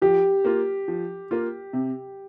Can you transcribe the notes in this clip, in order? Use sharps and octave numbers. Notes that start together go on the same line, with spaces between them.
F3 G4
A#3 F4
F3
A#3 F4
C3